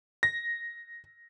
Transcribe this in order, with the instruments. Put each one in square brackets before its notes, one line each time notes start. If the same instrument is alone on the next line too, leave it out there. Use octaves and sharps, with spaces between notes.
[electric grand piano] A#6